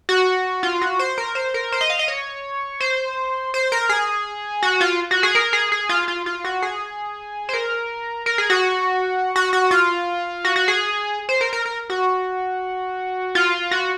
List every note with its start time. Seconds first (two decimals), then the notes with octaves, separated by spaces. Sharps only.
0.09 F#4
0.63 F4
0.81 F#4
0.99 C5
1.18 A#4
1.35 C5
1.54 A#4
1.72 C5
1.81 D#5
1.90 F5
1.99 D#5
2.08 C#5
2.80 C5
3.54 C5
3.72 A#4
3.89 G#4
4.63 F#4
4.81 F4
5.11 F#4
5.23 G#4
5.35 A#4
5.53 G#4
5.72 G#4
5.89 F4
6.08 F4
6.26 F4
6.45 F#4
6.62 G#4
7.49 C5
7.53 A#4
8.26 A#4
8.38 G#4
8.50 F#4
9.36 F#4
9.53 F#4
9.71 F4
10.45 F#4
10.56 F#4
10.68 G#4
11.29 C5
11.41 A#4
11.53 A#4
11.66 A#4
11.90 F#4
13.35 F4
13.71 F#4